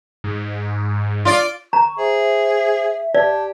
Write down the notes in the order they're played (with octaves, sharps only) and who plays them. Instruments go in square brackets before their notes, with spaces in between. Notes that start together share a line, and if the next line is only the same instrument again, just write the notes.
[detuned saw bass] G#2
[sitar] F4 D5
[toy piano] A#5 [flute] C#6
[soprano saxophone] G#4 [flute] C5 [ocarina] E5
[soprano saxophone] G4 [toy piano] D5 [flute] A5